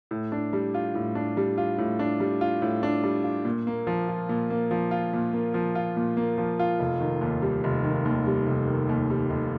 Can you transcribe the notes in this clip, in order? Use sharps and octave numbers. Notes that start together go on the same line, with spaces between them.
A2
D4
G3
F4
A2
D4
G3
F4
A2
D4
G3
F4
A2
D4
G3
F4
A#2
A#3
F3
F4
A#2
A#3
F3
F4
A#2
A#3
F3
F4
A#2
A#3
F3
F4
F1
D#3
D#2
G3
F1
D#3
D#2
G3
F1
D#3
D#2
G3
F1